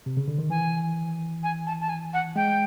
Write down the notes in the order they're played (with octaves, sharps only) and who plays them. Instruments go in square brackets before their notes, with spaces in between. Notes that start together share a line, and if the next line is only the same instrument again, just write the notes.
[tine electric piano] C3
C#3
D3
D#3
[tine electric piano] E3 [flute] G#5
[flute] G#5
A5
A5
G#5
F#5
[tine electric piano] G#3 [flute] G5